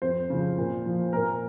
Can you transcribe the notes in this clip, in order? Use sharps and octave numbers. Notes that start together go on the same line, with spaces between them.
F2 C5
C#3 F3
A#2
F3
A#2 A#4